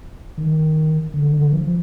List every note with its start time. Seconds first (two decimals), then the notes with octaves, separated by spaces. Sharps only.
0.38 D#3
1.14 D3
1.33 D3
1.52 F3